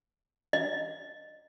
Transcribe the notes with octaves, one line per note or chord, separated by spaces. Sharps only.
D#5